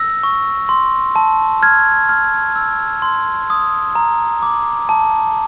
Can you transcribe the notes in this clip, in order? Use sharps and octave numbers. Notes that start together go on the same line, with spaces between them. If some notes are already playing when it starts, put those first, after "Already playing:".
Already playing: E6 A#6
C#6
C6
A5
F6 G#6
F6
E6
C6
D#6
A#5
D6
A5